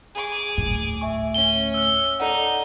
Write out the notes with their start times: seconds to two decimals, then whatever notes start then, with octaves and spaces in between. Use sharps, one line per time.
0.15 G#4 D6
0.58 D2 A2
1.01 E5 G#5 C#6
1.34 C#4 G7
1.74 E6 F6
2.20 D#4 A4 D5 F#5